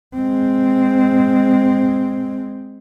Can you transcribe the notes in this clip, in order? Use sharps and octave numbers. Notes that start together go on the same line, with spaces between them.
G#3 C4